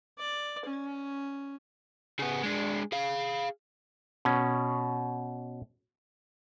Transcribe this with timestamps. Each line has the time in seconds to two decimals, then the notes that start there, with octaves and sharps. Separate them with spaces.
0.18 D5
0.65 C#4
2.19 C#3 B3
2.43 G#3 D4
2.92 G#4 F5
4.25 B2 C#4